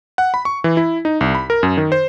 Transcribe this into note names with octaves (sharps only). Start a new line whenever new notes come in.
F#5
B5
C#6
E3
E4
D#4
C2
B5
A#4
F#2
D#3
C5